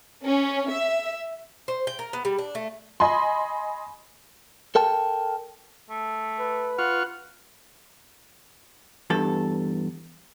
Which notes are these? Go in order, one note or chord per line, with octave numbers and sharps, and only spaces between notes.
C#4
E5
C5
G5
A#4
B3
G3
D4
A3
D#5 G#5 B5 C6
A4 A#4 G5 A5
A3
B4
F4 F#5 C#6 F6
E2 G2 A4